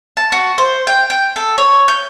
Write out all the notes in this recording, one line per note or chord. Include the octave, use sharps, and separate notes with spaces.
A5
F#4
C5
G5
G5
A4
C#5
G6